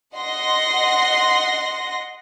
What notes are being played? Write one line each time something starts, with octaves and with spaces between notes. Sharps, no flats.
D#5 F#5 C6 A#6